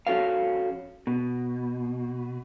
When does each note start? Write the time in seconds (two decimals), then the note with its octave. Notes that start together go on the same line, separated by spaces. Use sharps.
0.07 F2 C#4 F#4 A4 A#4 F5
1.07 B2